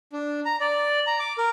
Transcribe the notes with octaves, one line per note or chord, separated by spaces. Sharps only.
D4
A#5
D5
A#5
D6
A#4